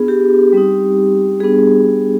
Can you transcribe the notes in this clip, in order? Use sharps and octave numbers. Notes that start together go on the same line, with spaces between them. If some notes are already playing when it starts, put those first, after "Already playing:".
Already playing: B3 D4 F4 G#4
G4
G3 C4 D#4
G3 B3 D4 G#4